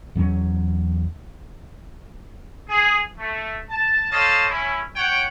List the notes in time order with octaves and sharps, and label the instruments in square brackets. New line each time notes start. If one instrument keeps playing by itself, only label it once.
[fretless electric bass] E2 F#3 B3 C#4
[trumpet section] G#4
A3
A5
A4 C5 C#5 D#5 F5 A5
C#4 E4
C#5 F#5 G5